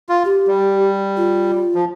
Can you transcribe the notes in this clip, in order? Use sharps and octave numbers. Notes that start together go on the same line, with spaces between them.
F4
G4
G3
F4
F3